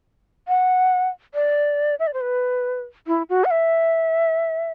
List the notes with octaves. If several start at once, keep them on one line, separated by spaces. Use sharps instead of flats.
F#5
D5
E5
D5
C5
B4
E4
F#4
F#5
E5